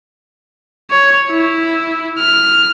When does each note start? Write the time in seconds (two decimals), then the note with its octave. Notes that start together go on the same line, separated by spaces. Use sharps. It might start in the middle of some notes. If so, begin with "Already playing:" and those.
0.91 C#5
1.30 E4
2.19 F6